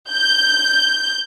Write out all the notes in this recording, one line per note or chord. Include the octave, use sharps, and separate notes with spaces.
G6